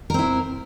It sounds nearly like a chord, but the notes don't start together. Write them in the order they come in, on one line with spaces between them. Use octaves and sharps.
A#4 C4 E4